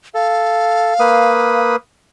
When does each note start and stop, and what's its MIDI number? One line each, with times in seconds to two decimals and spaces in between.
0.15 0.94 69
0.15 1.60 77
1.00 1.76 58
1.00 1.76 71
1.00 1.76 87